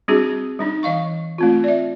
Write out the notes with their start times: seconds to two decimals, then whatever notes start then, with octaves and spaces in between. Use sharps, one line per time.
0.08 G3 C4 D4 F#4 G#4
0.59 G3 D4 D#4
0.83 E3 D#5 F5 C#6
1.38 A3 C4 F4
1.64 D5 E5